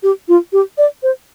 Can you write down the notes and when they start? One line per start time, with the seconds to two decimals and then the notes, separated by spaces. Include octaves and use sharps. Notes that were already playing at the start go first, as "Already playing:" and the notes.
0.03 G4
0.28 F4
0.53 G4
0.78 D5
1.03 C5